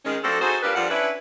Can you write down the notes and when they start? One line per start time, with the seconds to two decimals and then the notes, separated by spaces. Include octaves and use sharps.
0.05 D#3 G#3 C#4
0.23 F3 C4 D4 F#4 A4
0.41 D#4 F#4 G#4 A4 C5
0.63 G3 D4 F4 G4 A#4 B4
0.75 F2 F3 G3 D4 F4 F#5
0.91 C#4 D4 E4 B4